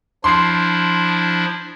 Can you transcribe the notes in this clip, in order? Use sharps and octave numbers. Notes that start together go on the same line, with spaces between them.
F3 D4 E4 C6 C7